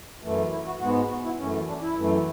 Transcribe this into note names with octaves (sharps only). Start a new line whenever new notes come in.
F#2 E3 A3
E4
F#4
G#2 G#3 B3 F#4
F#4
E4
F#2 E3 A3 C#4
D4
E4
F#2 E3 A3